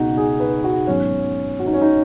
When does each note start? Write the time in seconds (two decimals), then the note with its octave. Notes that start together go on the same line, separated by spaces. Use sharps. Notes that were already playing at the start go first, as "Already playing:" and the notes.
Already playing: C#2 B2 B3 D#4 F#4
0.17 G#4
0.40 B4
0.64 F#4
0.87 G#2 D#3 F#3 B3 C#4
1.59 F#4
1.66 D#4
1.73 C#4
1.81 D#4